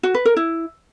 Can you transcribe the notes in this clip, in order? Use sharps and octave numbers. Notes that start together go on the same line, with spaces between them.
F#4
B4
A#4
E4